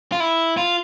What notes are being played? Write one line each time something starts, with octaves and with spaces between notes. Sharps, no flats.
F4
E4
F4